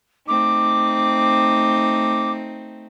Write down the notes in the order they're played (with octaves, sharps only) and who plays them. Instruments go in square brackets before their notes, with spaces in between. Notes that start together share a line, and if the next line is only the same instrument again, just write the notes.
[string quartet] A3 C4 D#4 [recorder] D6